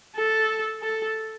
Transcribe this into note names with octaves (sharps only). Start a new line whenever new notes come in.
A4
A4